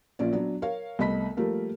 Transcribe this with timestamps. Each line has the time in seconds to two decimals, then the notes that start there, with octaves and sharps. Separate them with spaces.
0.19 A#1 A#2 C#4 D5
0.33 F#3 B3 D4
0.62 A#4 C#5 F5
0.99 C2 A3 B3 D#5 B5 B6
1.37 F3 G3 A3 A#3 A#4